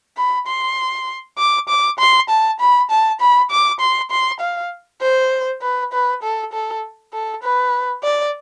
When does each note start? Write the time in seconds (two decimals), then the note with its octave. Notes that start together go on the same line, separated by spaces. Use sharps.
0.17 B5
0.47 C6
1.38 D6
1.69 D6
1.99 C6
2.30 A5
2.60 B5
2.90 A5
3.21 B5
3.51 D6
3.80 C6
4.11 C6
4.40 F5
5.02 C5
5.62 B4
5.93 B4
6.23 A4
6.53 A4
7.13 A4
7.42 B4
8.03 D5